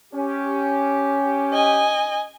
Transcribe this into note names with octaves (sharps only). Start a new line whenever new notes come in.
C#4 G4
D#5 G#5